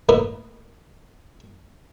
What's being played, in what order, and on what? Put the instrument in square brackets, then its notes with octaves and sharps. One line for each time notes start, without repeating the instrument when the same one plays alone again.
[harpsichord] A2 A#3 A#4 B4 D#5 E5